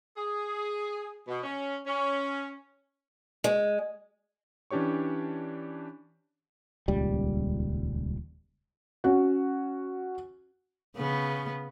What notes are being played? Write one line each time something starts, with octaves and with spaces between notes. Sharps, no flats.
G#4
B2
C#4
C#4
G#3
E3 C#4 D4 G4 C#5 C#6
D#1 C#2 G3
C#4 F#4
C#3 B3